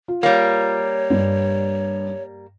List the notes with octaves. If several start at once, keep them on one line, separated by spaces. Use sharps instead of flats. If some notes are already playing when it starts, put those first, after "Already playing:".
F4
G3 A#3 C#5
G2